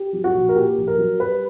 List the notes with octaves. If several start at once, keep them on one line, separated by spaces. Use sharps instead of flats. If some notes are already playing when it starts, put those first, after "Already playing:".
Already playing: G4
F#3
F#4
A#1
A#4
A#2 G4
A#1
A#4
F#3
G3 B4